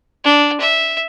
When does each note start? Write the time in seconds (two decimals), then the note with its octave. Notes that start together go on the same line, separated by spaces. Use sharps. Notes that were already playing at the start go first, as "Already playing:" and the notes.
0.24 D4
0.60 E5